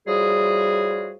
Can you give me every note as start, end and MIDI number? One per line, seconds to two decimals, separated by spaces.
0.07 1.14 45
0.07 1.14 53
0.07 1.14 55
0.07 1.14 66
0.07 1.14 68